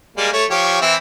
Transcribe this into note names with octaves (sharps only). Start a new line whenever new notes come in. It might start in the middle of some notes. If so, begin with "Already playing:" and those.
G3 G#3 A#3
A3 C#5
F3 G4 C#5
E3 C4 E4